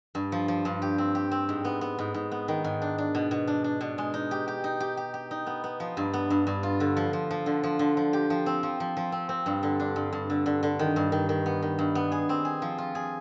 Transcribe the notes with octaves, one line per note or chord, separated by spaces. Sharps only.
G2
F3
F3
G2
G4
C4
G4
C4
G#2
B3
B3
G#2
G#2
B3
D#3
G#2
D4
D4
B2
B2
D4
D4
B2
G#3
D#4
G4
G4
D#4
G4
G4
G4
D#4
B3
B3
F3
G2
B3
G2
G2
F4
D3
F3
F3
F3
D3
F3
D3
F3
G4
F3
C4
F3
F3
F3
C4
C4
G2
D3
D4
G2
G2
D3
D3
D3
D#3
G2
D#3
D#3
B3
D#3
G2
B3
G#4
C4
G#4
F3
F4
G#4